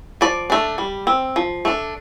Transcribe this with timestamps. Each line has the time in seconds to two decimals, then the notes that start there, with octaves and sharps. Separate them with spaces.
0.21 F3 D5
0.50 A3 D4
0.78 G3
1.07 C4
1.36 F3
1.65 A3 D4